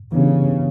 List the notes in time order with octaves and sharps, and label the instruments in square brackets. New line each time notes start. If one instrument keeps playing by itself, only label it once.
[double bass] C#3 [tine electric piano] E3 B3 D4 G4